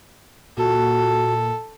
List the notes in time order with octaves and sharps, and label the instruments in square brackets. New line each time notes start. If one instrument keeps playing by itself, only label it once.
[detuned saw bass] A#2 [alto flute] F#4 [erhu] A4